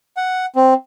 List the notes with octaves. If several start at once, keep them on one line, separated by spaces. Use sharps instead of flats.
F#5
C4